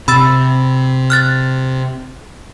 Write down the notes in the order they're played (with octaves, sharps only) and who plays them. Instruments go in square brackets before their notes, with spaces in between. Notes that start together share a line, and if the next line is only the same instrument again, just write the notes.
[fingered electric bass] C3 [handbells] B5 E6 A6
[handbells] F6 F#6 A6